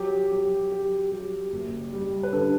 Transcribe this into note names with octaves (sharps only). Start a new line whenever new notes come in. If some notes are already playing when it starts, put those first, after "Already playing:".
Already playing: F#3 G4
F#3 G4
F#3 G4
F#3 G4
F#1
G3
B4
D3 A4